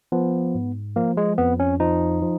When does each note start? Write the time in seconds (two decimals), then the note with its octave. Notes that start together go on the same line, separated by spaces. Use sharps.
0.12 F3 B3
0.55 G#2
0.96 F3 A#3
1.17 G#3
1.38 F2 B3
1.60 C#4
1.80 F3 D#4
2.22 F3